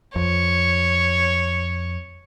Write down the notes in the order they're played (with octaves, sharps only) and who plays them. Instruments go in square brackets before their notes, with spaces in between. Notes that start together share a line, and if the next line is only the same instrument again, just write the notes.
[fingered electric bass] F2 [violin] C#5